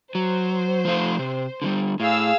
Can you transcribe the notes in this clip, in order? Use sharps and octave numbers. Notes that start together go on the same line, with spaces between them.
F#3 C5
F3 A3 F5
C3
D3 F3 G3
A2 G#4 F5 E6